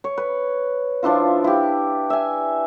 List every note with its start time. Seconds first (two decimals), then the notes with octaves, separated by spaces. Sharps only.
0.04 C#5
0.17 B4
1.03 F3 D4 E4 F4
1.44 E4 G4
2.10 E5 G#5